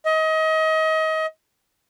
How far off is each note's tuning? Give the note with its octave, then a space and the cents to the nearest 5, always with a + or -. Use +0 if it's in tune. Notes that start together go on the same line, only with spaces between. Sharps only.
D#5 +30